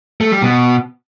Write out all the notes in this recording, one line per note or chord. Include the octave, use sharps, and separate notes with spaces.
A3
G3
B2